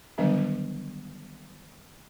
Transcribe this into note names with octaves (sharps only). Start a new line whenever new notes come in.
D3 D#3 F#3 G3 B3 D4